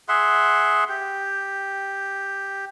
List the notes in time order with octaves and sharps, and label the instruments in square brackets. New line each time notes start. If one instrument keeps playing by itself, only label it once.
[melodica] G#4 E5 F#5 C6
G4